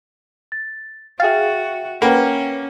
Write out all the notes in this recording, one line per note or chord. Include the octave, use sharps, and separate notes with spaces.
A6
F#4 G#4 E5 F5 G5 A6
A#3 C#4 B4 F#5 G5